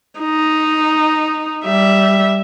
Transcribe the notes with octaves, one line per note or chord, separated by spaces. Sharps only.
D#4
G3 E5